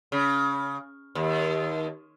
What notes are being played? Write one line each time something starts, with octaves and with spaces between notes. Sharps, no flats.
C#3
D#2